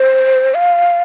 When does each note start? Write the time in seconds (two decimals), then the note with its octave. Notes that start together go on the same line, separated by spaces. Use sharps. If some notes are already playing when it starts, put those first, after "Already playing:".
Already playing: C5
0.54 F5